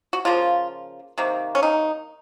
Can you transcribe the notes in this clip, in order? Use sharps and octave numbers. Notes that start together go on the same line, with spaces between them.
F#4
C#3 F3 A#3 F4
C3 D#3 A#3
C#4
D#4